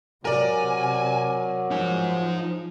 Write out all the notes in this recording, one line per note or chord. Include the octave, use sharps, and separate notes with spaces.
C3 F#3 A#4 D5 G#5
F3 D#4 G#5